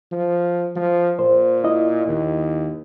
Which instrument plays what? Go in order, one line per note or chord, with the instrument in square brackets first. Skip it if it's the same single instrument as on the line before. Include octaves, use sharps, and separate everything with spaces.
[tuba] F3
F3
[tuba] A#2 [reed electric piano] C5
[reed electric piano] E4 D#5
[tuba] D#2